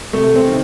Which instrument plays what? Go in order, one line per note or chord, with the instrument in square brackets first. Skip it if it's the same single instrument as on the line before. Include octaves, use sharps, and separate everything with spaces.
[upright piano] C3 [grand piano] A3
[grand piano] C4
[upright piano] D#3